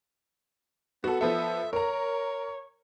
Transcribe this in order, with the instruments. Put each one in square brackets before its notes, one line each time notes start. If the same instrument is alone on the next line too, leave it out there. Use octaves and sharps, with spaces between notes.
[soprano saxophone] B3 [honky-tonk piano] F#4 A4
[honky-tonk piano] F3 B3 A4 [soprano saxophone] E5
[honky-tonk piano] A#4 A#5 [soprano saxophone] C#5